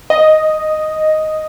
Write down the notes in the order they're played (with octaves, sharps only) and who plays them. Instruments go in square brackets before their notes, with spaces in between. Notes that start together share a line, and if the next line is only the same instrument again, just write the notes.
[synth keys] D#5